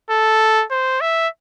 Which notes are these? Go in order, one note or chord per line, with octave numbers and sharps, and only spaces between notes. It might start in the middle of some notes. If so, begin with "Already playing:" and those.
A4
C5
E5